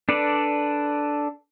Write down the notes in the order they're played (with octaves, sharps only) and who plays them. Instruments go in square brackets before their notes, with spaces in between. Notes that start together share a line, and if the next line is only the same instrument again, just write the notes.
[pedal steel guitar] D4 A4 B4 D5